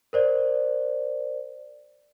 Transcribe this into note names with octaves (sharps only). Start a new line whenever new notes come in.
A#4 C5 D5